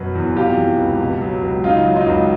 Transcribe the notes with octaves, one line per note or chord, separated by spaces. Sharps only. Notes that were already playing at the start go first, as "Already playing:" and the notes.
Already playing: F#2 B2 F#3 B4
E2
C3 F4 G4
E3
C#2
B2
F#3
C#2
C#3 D#4 F4
F#3
D#4 F4
C#2